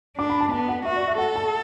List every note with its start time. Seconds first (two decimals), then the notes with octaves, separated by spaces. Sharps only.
0.18 D4 D6
0.30 B5
0.41 A5
0.51 B3 A5
0.69 F#5
0.85 F#4 E5
0.96 D5
1.07 E5
1.18 A4 F#5
1.36 A5